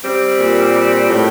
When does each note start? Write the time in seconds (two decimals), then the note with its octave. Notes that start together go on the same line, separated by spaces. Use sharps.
0.01 G3 C4
0.37 A#2
0.74 G3
1.09 A2